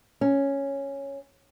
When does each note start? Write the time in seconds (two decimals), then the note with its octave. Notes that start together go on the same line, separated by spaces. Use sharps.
0.21 C#4